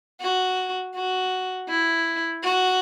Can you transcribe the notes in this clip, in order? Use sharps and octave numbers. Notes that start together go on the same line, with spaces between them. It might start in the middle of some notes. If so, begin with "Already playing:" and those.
F#4
F#4
E4
F#4